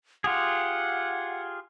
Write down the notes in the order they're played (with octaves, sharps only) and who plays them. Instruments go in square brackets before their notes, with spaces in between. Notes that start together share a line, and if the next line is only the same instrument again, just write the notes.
[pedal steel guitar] F4 G4 G#4 [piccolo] F#5